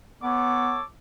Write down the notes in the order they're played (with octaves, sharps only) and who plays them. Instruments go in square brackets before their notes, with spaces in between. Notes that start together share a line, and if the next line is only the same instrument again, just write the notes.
[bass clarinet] B3 [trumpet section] A4 C#5 D6